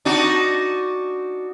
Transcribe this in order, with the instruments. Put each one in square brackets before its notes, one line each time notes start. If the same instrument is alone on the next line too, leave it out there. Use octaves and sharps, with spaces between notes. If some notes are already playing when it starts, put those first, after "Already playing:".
[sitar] D4 D#4 F#4